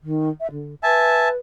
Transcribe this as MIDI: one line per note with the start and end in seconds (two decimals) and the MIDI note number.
0.01 0.29 51
0.40 0.47 76
0.51 0.74 50
0.83 1.36 71
0.83 1.29 76
0.83 1.29 80
0.83 1.29 81